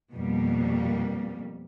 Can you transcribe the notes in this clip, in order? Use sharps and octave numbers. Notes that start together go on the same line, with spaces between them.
F2 B2 G3 A#3